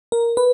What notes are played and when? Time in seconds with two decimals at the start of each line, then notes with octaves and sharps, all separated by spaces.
0.12 A#4
0.37 B4